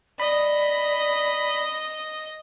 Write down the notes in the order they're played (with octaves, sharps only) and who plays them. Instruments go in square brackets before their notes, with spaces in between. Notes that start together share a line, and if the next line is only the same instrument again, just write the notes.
[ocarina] D5 [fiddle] D#5 [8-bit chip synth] B5